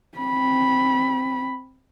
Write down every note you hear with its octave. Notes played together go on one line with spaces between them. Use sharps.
C4 B5